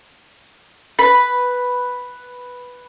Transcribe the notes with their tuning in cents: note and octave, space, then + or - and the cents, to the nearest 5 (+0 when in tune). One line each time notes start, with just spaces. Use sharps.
B4 +0 B5 +0